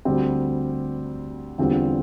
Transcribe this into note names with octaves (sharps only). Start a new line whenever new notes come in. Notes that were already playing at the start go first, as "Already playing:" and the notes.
D2 D3 G3 C4
E2 D3 G3 C4 F4